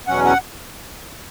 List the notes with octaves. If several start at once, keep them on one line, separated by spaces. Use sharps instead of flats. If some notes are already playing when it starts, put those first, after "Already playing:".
E2 B2 F#3 C#4 F#5
F#5